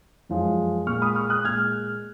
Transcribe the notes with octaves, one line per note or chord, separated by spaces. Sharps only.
F#2 F3 G#3
A#2 G#3 C#6 F6
B5 D#6
C#6 F6
D#6 F#6
A#2 G#3 F6 G#6